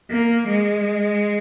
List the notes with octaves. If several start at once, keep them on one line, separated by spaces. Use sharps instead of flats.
A#3
G#3